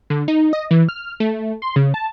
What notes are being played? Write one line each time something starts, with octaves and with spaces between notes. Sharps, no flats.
D3
D#4
D#5
E3
F6
A3
C6
C#3
A5